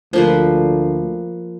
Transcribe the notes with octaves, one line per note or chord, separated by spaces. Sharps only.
D2 F3 A#3 B4